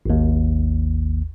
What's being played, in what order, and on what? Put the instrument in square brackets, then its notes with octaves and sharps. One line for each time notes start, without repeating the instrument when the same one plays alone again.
[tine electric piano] G#1 D#2